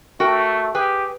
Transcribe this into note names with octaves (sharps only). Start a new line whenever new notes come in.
A3 F#4 A#4 G5
G4 G#4 B4 G#5